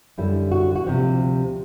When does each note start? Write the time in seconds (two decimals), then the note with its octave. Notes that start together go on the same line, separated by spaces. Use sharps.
0.18 F#2 D3 G3 E4
0.52 F#4
0.76 F#4
0.86 D2 C3 F3 G4